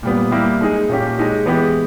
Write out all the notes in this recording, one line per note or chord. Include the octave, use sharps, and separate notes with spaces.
A#2 G3 B3
G3 A#3 E4 G4
G#3 D#4 G#4
A#2 A#3 C#4 G4
G#3 D#4 G4
E3 G#3 B3 G4